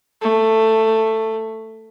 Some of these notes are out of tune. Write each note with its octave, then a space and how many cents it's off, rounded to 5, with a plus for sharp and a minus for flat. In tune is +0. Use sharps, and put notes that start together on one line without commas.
A3 +10